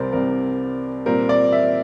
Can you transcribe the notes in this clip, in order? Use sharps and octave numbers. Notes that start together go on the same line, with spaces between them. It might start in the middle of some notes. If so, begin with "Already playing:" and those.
Already playing: C2 C3 G3 C4 A#4 C5 D5
C2 C3 G3 C4 A#4
A#2 G3 C4 A#4
D5
E5